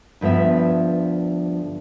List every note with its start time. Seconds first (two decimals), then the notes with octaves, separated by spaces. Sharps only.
0.21 D2 G2 F3 B3 E5